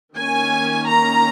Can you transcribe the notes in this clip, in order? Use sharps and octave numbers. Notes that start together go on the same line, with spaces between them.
D#3 A#3 C#4 G#5
A#5